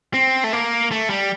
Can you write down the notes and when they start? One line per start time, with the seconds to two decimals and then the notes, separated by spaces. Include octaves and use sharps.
0.14 C4
0.44 A3
0.53 A#3
0.91 A3
1.10 G3